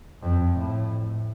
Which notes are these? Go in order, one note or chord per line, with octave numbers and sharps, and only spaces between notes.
F2
A2